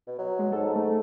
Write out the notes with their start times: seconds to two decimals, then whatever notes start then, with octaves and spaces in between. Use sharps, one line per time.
0.07 B2
0.19 F#3
0.39 G#3
0.52 G#2 A4
0.76 A3